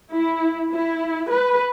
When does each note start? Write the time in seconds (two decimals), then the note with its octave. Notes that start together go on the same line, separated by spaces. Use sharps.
0.12 E4
0.72 E4
1.29 B4